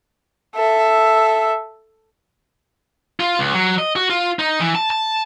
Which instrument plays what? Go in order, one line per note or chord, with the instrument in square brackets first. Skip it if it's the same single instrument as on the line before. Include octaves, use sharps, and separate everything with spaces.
[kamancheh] A4 E5
[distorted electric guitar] F4
C#2
F#3
D#5
F#4
F4
D#4
E3
A5
A5